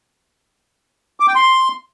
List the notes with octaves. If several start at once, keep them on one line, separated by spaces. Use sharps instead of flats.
D6
G5
C6